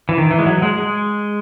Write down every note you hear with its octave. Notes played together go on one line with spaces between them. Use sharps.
E3
D#3
E3
G#3
F#3
G#3
G#3